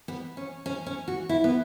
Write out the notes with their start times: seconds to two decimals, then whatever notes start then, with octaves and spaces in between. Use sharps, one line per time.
0.08 B3
0.37 C#4
0.66 C#4
0.86 C#4
1.08 F#4
1.29 E4
1.44 B3